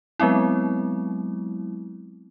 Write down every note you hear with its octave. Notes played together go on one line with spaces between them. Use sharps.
F#3 G#3 B3 C4 E4